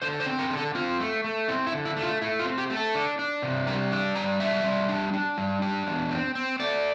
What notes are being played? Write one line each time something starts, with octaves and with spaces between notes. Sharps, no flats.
D3 C5
C5
C4
A#4
D3
A4
C4 F4
A3
A3
C4 E4
E4
D3
E4
A3
F4
A3 E4
F4
C4
G4
A3
A4
D4
D4
C3
G3 A#4
D4
G3 A#5
D4 E5
G3
D4
D4
G3
D4
E2
C4
C4
A3 D5